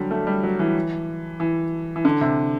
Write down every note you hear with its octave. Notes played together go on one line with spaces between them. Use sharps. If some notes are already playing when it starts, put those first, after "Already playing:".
Already playing: D3 F#3 G3
A3
G3
F#3
E3
E3
E3
D3
C3